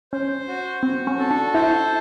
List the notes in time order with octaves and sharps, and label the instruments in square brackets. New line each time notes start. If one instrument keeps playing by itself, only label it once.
[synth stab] C#4 [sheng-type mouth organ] C5
[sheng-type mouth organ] F#4
[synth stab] C4 [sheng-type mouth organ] F#4
[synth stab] C#4
[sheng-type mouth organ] A4
[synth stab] D4
[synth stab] E4 [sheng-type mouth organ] C5